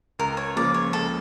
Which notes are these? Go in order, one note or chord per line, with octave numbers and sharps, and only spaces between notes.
C#2 A#4
C#5
C#3 F3 A#3 D5
C#5
C#2 A4